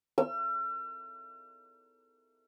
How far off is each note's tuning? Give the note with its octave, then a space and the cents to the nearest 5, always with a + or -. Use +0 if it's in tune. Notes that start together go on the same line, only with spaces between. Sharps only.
E6 +45